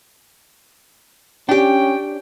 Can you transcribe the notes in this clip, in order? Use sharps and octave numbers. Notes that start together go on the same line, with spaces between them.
C#4 D4 G4 G5